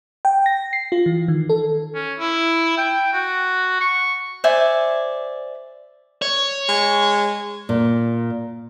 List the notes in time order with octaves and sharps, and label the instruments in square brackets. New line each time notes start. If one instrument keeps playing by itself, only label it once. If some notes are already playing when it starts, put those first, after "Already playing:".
[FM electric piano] G5
A#6
C7
F4
E3
D#3
A4
[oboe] C#4
E4
G5
F#4
C#6
[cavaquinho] C5 D5 E5 G#5
[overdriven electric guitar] C#5
[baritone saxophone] G#3
[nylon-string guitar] A#2